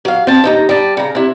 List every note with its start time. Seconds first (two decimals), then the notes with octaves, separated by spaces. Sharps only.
0.05 F#3 F5
0.27 C4 A5
0.44 D#2 D#4 A#5
0.69 G3 A5
0.97 C#3 A#5
1.15 C3 E4